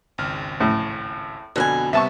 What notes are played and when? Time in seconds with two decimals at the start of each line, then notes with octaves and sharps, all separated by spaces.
0.18 G#1 C#2 F6
0.61 A2
1.56 F2 B2 D3 C5 G#5 F#6
1.93 C3 G3 B3 E5 A5 C#6